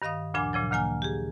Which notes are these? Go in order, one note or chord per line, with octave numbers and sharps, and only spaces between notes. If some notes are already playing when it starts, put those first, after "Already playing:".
G2 D#3 D#5 F5 D#6
D2 A#2 F3 D4 G#5 B5
A#2 C#3 F3 F#3
D2 D#3 A#3 G#5 F6
G4 G#4